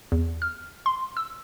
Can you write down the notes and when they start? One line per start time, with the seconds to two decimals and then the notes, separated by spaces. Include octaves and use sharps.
0.12 E2
0.42 F6
0.86 C6
1.17 E6